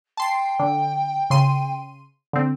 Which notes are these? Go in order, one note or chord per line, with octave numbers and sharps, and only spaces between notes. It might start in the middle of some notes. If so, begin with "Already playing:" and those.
G5 A5 C6 C7
D3
C#3 C6 D#7
D3 C4